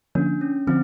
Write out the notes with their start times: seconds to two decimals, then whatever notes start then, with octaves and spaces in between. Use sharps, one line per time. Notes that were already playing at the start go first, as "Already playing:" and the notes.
0.15 D3 F3 A#3 C#4 D4
0.41 C#4
0.67 D3 F3 C4